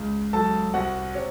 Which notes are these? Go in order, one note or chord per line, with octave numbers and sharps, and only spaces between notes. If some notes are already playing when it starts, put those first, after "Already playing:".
Already playing: C#2
F#3 A4 A5
C2 F#4 F#5
C3 C#5